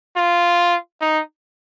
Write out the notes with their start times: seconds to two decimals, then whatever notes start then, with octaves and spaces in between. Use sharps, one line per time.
0.17 F4
1.01 D#4